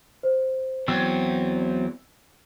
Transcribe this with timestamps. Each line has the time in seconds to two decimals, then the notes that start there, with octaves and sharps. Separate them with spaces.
0.23 C5
0.88 E2 F#3 C4 E6